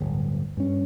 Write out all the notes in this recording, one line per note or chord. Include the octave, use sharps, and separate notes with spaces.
D1 G1
G2 C#4